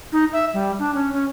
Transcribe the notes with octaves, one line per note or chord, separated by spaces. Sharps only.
D#4
E5
G3
D4
C#4
C#4